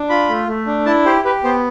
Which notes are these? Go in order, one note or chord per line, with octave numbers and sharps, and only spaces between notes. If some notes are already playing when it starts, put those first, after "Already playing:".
Already playing: D4
F4 B5
A3
A3
D4
E4 A5
G4 C5
G4 B4
B3 C5